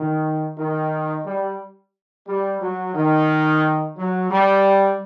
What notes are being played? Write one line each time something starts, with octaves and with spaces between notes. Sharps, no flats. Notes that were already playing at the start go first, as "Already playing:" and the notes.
Already playing: D#3
D#3
G3
G3
F#3
D#3
F#3
G3